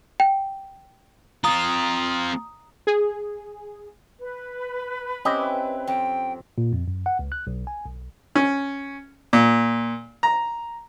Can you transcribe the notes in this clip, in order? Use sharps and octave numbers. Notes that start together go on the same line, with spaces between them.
G5
C4 F4 A#5 D#6
G#4
B4
C4 C#4 E4 G4 D#5
F2 G5
A#2
F2
F#2
F#5
C#2
F#6
B1
G#5
B1
C#4
A#2
A#5